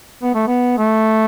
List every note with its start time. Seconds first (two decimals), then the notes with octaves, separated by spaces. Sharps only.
0.23 B3
0.35 A3
0.48 B3
0.78 A3